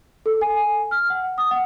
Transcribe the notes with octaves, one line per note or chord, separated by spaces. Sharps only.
A4
G#5
F6
F#5
D#6
F#5